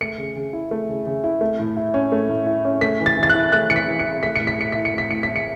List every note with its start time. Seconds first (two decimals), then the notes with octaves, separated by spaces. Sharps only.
0.01 A3 C#7
0.18 C#3
0.36 C#3
0.53 E4
0.71 A3
0.89 C#3
1.06 C#3
1.24 E4
1.41 A3
1.59 A2
1.77 E4
1.94 C#4
2.12 A3
2.29 A2
2.47 E4
2.65 C#4
2.81 A3 B6
3.00 E3
3.06 A6
3.17 E3
3.23 A6
3.29 F#6
3.35 E4
3.52 A3 F#6
3.70 E3 C#7
3.76 B6
3.88 E3
3.99 C#7
4.04 E4
4.23 A3 B6
4.36 A2 C#7
4.47 B6
4.58 A2 C#7
4.72 E4 B6
4.85 C#7
4.94 A3 B6
5.11 A2 C#7
5.23 B6
5.29 A2
5.36 C#7